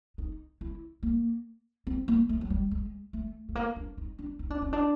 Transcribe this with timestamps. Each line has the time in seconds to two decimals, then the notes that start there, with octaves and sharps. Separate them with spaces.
0.18 D#4
0.61 E4
1.03 A#3
1.87 C4
2.08 A#3
2.29 A3
2.41 F#3
2.50 G3
2.71 G#3
3.13 A3
3.49 A3
3.55 A#3
3.76 D4
3.98 D#4
4.19 D4
4.39 D#4
4.50 D4
4.62 C#4
4.73 D4